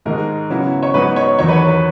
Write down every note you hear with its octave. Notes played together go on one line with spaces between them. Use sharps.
G#2 D#3 G#3 A#4
C#3 F#3 B3 E4
C#5
G#2 F#3 B3 D#4 B4
C#5
E2 D#3 F#3 C#5
B4
C#5
B4